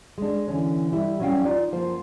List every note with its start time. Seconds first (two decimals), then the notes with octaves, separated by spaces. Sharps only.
0.18 G#3 D4
0.48 D3 E3 C#4
0.92 G3 E4
1.20 F#3 G3 C#4 D#5 F5 G5
1.45 D#4 F4 D5
1.72 F#2 F3 A#3 F4 C5